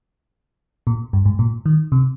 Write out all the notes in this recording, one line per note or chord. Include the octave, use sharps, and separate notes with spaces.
A#2
G2
G#2
A#2
D#3
C3